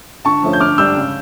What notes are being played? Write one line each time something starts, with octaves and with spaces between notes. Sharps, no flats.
D3 A5 C#6
F3 A3 C#4
G6
D3 D6 F6
G3 D4 E6 G6
C#3